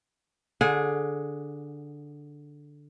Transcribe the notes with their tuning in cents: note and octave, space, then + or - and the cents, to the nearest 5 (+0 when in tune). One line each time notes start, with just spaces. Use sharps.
D3 +0 G#4 +5 F#5 -35